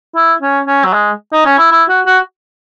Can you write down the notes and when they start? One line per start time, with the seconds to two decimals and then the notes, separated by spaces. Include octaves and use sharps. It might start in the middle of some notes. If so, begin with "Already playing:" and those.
0.15 E4
0.41 C#4
0.67 C#4
0.85 F#3
0.93 G#3
1.32 D#4
1.45 C#4
1.58 E4
1.71 E4
1.89 F#4
2.06 F#4